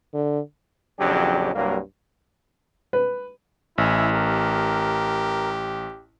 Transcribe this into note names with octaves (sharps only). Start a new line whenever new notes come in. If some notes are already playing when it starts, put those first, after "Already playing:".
D3
A#1 F2 C#3 F#3 D4 G4
C2 G2 F#3 A#3
B4
A1 E4 E5 G#5
G4 A#4